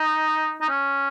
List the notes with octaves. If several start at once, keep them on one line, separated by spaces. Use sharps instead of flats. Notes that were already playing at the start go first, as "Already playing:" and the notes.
Already playing: D#4
D#4
C#4